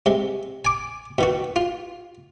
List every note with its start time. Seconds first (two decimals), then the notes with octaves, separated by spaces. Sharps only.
0.06 C3 G#3
0.65 G#5 D6
1.18 B2 D#3 F#4
1.56 F4